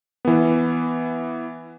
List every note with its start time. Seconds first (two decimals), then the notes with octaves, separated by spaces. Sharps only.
0.25 E3 B3